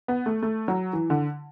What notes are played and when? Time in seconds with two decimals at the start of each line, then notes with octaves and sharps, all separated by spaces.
0.08 B3
0.26 A3
0.42 A3
0.68 F#3
0.93 E3
1.10 D3